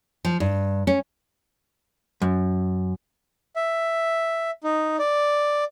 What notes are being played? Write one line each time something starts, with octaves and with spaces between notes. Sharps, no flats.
F3
G2
C#4
F#2
E5
D#4
D5